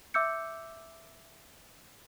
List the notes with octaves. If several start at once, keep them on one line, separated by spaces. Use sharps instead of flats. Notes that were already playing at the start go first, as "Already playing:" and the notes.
E5 D6 E6 G6 C#7